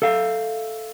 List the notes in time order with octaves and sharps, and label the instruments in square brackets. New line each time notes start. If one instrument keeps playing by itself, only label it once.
[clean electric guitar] A4 E5 F5